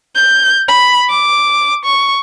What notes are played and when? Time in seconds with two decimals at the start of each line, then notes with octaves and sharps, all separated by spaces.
0.16 G6
0.69 B5
1.10 D6
1.85 C#6